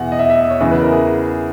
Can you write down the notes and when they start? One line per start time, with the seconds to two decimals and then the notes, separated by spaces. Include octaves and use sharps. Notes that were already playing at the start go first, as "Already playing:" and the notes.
Already playing: E2 B2 F#5
0.12 D#5
0.19 E5
0.30 E5
0.40 D#5
0.50 C#5
0.60 E2 C#3 E3
0.71 B4
0.82 A#4
0.92 G#4